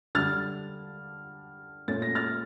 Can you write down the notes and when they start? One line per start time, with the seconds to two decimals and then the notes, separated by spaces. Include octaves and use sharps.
0.15 D3 G3 D4 F6 A6
1.88 A#2 A3 C#4 A6
2.02 A#6
2.15 F6 A6